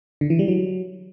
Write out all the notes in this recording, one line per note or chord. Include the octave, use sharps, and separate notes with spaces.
D3
E3
G3
F#3